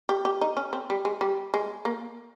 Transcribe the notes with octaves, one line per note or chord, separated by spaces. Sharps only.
G4
G4
D#4
C#4
C4
G3
G#3
G3
G#3
A#3